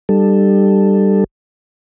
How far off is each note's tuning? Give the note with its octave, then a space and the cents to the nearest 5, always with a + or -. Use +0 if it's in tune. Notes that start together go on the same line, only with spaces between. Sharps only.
G3 +0 D4 +40 A4 +0